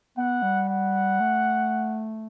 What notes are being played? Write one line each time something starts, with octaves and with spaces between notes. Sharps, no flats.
B3 F#5
G3
F#5
A3